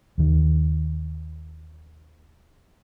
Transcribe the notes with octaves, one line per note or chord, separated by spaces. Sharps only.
D#2 D#3